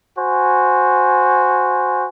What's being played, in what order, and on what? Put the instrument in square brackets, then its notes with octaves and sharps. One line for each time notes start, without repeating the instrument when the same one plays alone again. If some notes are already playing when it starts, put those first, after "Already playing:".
[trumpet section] F#4 C5 G#5